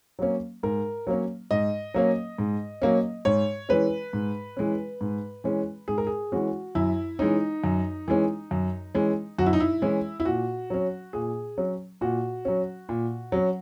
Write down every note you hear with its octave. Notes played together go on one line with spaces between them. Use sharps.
F#3 A#3 C#4
G#2 A#4
F#3 A#3 C#4
G#2 D#5
F#3 A#3 C#4
G#2
F#3 A#3 C#4
G#2 C#5
E3 G#3 C#4 B4
G#2
E3 G#3 C#4
G#2
E3 G#3 C#4
G#2 G#4
A#4
G#4
E3 G#3 C#4 F#4
F#2 E4
E3 G#3 C#4 D#4
F#2
E3 G#3 C#4
F#2
E3 G#3 C#4
F#2 F#4
E4
D#4
E4
E3 G#3 C#4
E4
A#2 F#4
F#3 C#4
A#2 G#4
F#3 C#4
A#2 F#4
F#3 C#4
A#2
F#3 C#4